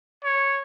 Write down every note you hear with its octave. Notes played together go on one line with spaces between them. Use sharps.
C#5